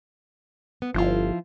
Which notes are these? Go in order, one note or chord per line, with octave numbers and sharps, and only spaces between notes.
B3
G1 F3 E4 F4